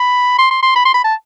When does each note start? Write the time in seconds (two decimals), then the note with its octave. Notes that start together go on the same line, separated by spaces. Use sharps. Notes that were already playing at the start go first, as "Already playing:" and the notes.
Already playing: B5
0.38 C6
0.51 C6
0.63 C6
0.76 B5
0.85 C6
0.94 B5
1.04 A5